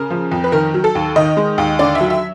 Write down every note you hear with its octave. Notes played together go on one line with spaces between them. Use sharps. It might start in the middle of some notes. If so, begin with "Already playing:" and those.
Already playing: C#3 A#4
F3
F2
B4
D#3 A#4
F#3
A4
D#2
D#3 D#5
G#3
D#2
D3 D5
E5
F#3
E5